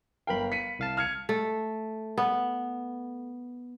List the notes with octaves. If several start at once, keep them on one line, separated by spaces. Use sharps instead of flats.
G1 A#4 F5 G5 B5
B6 C#7 D#7
C2 F5 A5
F6 G#6 C#7
A3
B3